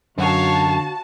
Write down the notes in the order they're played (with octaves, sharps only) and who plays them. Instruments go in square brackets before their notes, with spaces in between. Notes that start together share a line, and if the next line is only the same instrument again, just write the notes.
[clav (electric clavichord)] F#2 F#5 [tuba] D3 [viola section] F#4 A5 [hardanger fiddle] C#5 F5